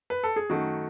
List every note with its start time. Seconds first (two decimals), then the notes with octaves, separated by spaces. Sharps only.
0.10 B4
0.23 A4
0.36 G#4
0.49 F#2 D#3 A3 F#4